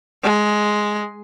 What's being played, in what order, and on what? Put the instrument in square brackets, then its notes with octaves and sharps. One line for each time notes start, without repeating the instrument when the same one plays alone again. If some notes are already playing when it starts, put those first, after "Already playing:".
[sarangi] G#3